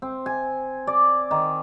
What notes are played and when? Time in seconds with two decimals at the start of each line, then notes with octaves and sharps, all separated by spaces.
0.02 C4
0.26 G#5
0.87 D5
1.31 D#3